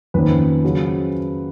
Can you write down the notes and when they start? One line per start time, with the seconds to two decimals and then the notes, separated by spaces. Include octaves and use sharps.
0.14 F2 D#3 A#3 C#4 B4
0.64 C#3 F#3 C#4